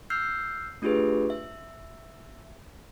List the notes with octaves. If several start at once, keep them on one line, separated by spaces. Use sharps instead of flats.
E6 F6 G6 C7
A3 D4 F4 G4 G#4 B4
E5